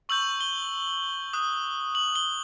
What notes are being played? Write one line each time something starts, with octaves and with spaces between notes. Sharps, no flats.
C#6 E6 G6 F#7
G7
D#6 F#6
F#7
G7